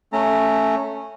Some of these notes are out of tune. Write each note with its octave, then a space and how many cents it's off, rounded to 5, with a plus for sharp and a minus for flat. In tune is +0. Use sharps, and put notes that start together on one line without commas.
A3 +0 C#4 +0 A#5 -25